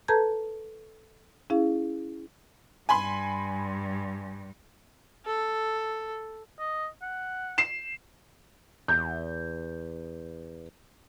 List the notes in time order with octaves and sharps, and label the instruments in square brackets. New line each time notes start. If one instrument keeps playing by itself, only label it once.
[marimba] A4 B4 A5 A#5 G6 G#6
C#4 E4 G#4 F5
[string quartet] G2 [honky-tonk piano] G#5 B5 C6
[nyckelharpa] A4
[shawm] D#5
F#5
[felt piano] C7 E7
[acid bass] E2 [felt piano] G6